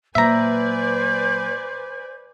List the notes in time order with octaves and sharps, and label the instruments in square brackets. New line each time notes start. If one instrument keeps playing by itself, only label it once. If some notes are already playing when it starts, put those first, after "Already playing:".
[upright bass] A#2 F#3 [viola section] B4 D5 G#5 [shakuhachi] C5 [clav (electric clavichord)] E5 A#5